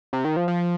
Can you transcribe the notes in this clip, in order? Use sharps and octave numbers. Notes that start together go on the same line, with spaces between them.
C3
D#3
F3
F3